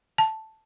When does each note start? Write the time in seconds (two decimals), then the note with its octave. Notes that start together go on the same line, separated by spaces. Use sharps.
0.18 A5